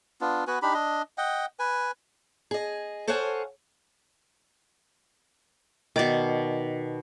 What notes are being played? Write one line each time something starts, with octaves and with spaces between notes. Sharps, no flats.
B3 D4 F4
B3 F#4 B4 G#5
D4 D#4 G4 B5
D4 D#5
D#5 F#5 G5
B4 G#5
G#4 D#5
A4 C5 C#5 F5 F#5 G#5
B2 D#3 D5 D6